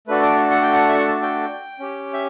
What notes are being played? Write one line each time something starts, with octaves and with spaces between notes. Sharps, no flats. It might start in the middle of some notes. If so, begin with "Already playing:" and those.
A3 D4 F#4 A4 B4
D5
F#5
G5
F#5
E5
F#5
A5
G5
C#4 G4
E5